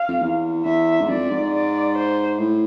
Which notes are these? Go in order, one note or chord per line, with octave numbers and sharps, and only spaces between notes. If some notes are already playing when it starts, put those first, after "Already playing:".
Already playing: F5
F2
E2
E2 E5
G#2
F2 D5
G#2
D5
C5
A2